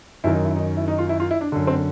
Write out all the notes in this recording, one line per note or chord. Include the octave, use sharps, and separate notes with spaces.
F#2 D#3 E4
D#4
E4
D#4
E4
D#4
F4
E4
F4
E4
D4
F#2 D3
C4